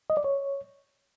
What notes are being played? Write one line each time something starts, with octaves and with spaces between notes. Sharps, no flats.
D#5
D5
C#5